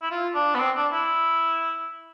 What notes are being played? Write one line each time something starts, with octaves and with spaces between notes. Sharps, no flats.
E4
F4
D4
B3
C4
D4
E4